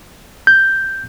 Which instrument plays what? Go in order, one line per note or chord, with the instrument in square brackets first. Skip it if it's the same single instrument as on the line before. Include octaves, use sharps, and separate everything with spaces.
[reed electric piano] G6